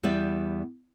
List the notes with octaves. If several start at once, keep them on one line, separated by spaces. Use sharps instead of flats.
E2 G3 B3 D5 E5